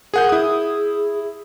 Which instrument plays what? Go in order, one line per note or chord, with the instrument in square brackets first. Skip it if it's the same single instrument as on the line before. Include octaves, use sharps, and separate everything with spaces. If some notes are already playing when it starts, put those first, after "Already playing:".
[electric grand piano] G#4 F#5 G6 [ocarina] A#4
[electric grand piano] E4 D#6 [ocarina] G#4